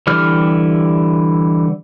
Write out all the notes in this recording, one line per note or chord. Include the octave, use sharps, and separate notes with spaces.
D3 E3 G3 G4 F6